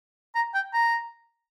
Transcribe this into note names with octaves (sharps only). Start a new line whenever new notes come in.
A#5
G5
A#5